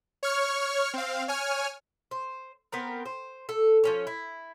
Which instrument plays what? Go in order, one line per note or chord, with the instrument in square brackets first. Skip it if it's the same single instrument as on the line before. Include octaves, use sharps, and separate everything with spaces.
[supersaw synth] C#5 C#6 F6
C4 F5
C#5 G#5 F6
[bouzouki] C5
B3 C4 A#4
C5
A4
F3 C#4 C#5
E4